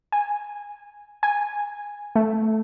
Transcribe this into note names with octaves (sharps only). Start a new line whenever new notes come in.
G#5
G#5
A3